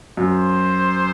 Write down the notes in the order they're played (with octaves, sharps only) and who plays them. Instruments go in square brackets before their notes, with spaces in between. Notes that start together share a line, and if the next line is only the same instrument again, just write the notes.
[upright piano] F#2 [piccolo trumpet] C5